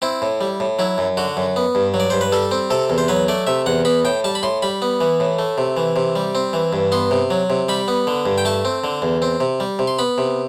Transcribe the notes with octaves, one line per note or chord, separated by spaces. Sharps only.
C4 E4
A2
G3
A2
F#3 E4
F#2
D3 F#4
F#2
B3
G2
F#3
D5
G2 C5
B4
G3 A4
C4
C3 A4
E2
C5
F#3 B4
A3 D5
C3 E5
E2 F#5
B3 B5
A2 G5
G3 A5
B5
A2 C6
G3 B5
B3
E3
A2
A3
C3
E3
C3
G3
C4
E3
G2
B3 C6
C3
F#3
C3
G3 B5
B3
D3
G2
G5
A3 A5
C4
D3
E2
C4
C3
G3
C3
C6
B3 B5
C3